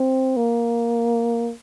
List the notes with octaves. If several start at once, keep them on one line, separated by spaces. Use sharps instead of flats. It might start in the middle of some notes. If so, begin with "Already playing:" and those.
Already playing: C4
A#3